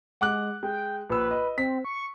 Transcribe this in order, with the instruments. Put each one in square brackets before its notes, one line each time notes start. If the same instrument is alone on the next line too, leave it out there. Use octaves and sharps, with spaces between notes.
[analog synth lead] G#3 [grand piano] F#5 D6 F#6
[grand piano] G#3 [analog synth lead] G5
[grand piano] A#1 E6 [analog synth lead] B4
[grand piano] D#5
[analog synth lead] C4 [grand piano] B6
[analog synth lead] C#6